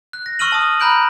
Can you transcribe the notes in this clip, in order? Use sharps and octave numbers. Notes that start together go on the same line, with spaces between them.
F#6
A#6
C#6 E6 F6 D#7 F#7
A5 D#6
A#5 B5 F#6 G6 D7 F#7